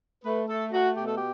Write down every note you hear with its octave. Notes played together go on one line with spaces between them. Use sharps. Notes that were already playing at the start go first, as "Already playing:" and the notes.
A3 B4
A3 A4
A3 F#4
B2 G4
A4
G4